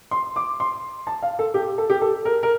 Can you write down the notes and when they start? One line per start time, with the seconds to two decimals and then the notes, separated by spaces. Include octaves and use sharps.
0.11 C6
0.36 D6
0.60 C6
1.07 A5
1.22 F5
1.39 A4
1.54 G4
1.78 A4
1.90 G4
2.01 A4
2.25 A#4
2.43 A#4